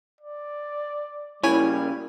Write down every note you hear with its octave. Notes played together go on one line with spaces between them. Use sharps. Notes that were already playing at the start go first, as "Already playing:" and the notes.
D5
C#3 G3 A#3 E4 C#5 G#5